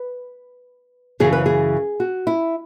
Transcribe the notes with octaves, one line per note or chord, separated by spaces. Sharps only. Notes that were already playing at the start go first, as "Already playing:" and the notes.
Already playing: B4
F#2 C#3 E3 G#4
B4
G#4
F#4
E4